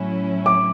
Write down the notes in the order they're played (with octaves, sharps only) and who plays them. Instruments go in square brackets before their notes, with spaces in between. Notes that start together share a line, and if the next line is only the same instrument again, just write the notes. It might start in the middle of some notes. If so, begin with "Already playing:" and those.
Already playing: [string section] A2 F#3 C#4 E4
[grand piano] D6